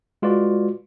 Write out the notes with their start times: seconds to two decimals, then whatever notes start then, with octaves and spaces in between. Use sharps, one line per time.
0.22 G#3 F4 F#4 B4 D5